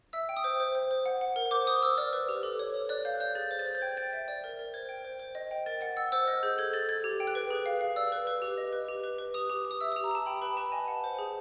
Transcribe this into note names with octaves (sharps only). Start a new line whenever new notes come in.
E5 E6
G5
D#6
C5
C5
C5
C5
F#5
F#5
A#4
C5 D6
C5 D#6
C5 E6
D5 F6
B4
G4
A4
C#5
A4
D5 F#6
F5 G6
D5 G6
G#4 A6
C5
A6
C5
G6
G5 G#6
G5 A6
E5 A6
D5
A#4
A#4
C5 G#6
G5
C5
C5
D#5
G5
A#4 A6
F#5 A6
F#5 E6
C5 E6
D#5 F6
G#4 G6
A4 G#6
A4 A6
A4 G#6
G4
G5
F#6
B4
G#4
F5
F5
D5 E6
B4
B4
G4
D#5
B4
G4
B4
B4
G4 D#6
G4
G4
D#6
E5 E6
G4 D#6
A#5
G4 A5
G5 B5
B4 B5
B4 A5
D#5 G#5
F#5
C5
G#4